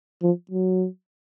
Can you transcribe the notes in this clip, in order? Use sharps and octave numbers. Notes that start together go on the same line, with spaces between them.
F3
F#3